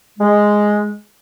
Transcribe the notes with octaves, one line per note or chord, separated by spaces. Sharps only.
G#3